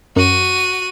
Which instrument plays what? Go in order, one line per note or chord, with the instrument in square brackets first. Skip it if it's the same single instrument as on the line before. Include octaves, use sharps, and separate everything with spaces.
[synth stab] F#2 [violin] F#4 D#7